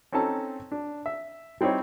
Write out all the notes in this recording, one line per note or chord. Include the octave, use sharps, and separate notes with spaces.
C4 C#4 D#4 A4 A5 A#5
D4
E5
G3 C4 D#4 E4 C#5